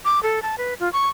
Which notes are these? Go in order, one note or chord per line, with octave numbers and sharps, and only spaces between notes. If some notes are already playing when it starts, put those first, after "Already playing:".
D6
A4
A5
B4
F4
C#6